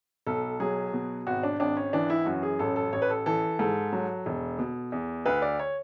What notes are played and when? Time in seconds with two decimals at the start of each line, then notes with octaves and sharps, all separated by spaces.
0.27 B1 A4
0.60 F#3 G#4
0.93 B2
1.27 G#1 F#4
1.43 D4
1.60 G#1 D4
1.77 C#4
1.93 E3 D4
2.10 E4
2.26 F#2 F#4
2.43 G#4
2.59 A1 A4
2.76 A4
2.93 A1 C#5
3.02 B4
3.10 A4
3.26 E3 A4
3.59 G#2 A4
3.93 F#3
4.26 E1
4.59 B2
4.92 E2
5.26 D2 B4
5.42 D5
5.59 C#5